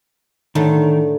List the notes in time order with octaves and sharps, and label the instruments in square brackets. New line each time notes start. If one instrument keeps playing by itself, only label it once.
[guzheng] A2 D3 A3 [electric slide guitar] D#3